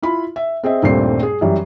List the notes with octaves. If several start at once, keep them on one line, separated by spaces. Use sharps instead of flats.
E4 F4 B5
E5
C4 G#4 D#5 E5
D#1 G2 A#2 A3 C4 C7
G#4
F#2 E3 G3